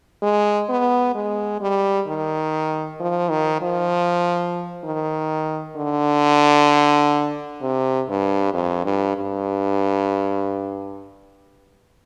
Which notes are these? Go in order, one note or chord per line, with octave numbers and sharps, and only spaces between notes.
G#3
B3
G#3
G3
D#3
F3
D#3
F3
D#3
D3
C3
G2
F2
G2
G2